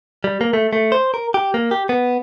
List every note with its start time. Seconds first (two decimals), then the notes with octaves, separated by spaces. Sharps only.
0.24 G3
0.41 A#3
0.53 A3
0.73 A3
0.92 C5
1.14 A#4
1.34 G4
1.54 A#3
1.71 G4
1.89 B3